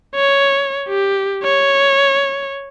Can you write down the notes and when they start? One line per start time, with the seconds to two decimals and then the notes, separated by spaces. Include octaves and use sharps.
0.16 C#5
0.88 G4
1.44 C#5